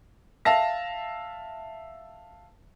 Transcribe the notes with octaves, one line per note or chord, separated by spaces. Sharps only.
E5 F5 A5 A#6